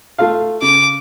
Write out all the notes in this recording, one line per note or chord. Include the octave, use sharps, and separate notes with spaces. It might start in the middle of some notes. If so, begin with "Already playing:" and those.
A3 F4 F5
C#3 D6